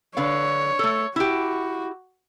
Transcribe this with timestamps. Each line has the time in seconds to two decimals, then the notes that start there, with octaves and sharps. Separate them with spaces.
0.17 D3 B4 C#5 F5
0.79 A3 A4
1.16 E4 F#4 G4